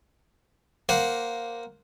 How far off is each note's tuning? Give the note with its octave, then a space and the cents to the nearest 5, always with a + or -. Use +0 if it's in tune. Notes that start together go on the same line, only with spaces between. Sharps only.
A#3 +0 C5 +0 F#5 +0